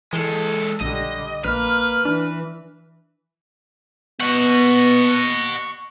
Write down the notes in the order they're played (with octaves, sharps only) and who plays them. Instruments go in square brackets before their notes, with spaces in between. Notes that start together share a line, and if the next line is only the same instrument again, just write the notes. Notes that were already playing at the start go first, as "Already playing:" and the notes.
[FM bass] E3 [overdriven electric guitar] G#3 A4
[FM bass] A#1 [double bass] D3 G3 [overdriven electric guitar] D#5
[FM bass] A#1 [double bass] A#3 [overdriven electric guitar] B4 [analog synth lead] F6
[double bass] E3 [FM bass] D4
[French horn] B3 [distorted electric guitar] D#5 F#5 [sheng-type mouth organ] C#6